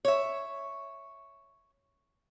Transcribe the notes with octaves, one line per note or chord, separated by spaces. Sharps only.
C#5 E5